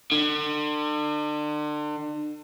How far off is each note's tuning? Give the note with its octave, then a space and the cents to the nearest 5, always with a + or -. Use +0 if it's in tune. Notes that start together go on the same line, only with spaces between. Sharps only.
D3 +35